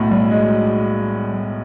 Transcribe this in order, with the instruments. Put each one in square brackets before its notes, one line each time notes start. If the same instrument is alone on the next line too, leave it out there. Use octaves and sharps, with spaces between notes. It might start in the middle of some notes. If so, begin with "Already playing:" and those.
Already playing: [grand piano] B1 A2
[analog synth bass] G3
[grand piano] G#3